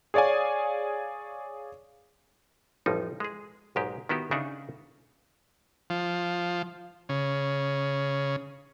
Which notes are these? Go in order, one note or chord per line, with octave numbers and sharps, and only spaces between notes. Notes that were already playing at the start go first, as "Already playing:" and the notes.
G#4 C#5 D5 F5 G#5
A1 F2 F3 G3 D#4
G#3 G#4
B1 G#2 G#3 G4
D#3 B3 E4 F#4 G4
C#3 D4 D#4 C#5 E5 F#5
F3
C#3